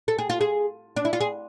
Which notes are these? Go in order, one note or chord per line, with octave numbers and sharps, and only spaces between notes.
A4
G#4
F4
G#4
D4
E4
F4
G#4